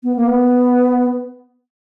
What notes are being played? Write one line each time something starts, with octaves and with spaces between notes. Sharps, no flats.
B3
A#3
B3